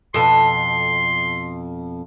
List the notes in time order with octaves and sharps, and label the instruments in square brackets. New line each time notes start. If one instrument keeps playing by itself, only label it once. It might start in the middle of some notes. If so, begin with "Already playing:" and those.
[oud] F2 B2 A4 [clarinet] C6